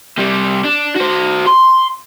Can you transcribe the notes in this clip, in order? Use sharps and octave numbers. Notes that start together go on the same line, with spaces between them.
C3 G3
D4
F#4 C5
C6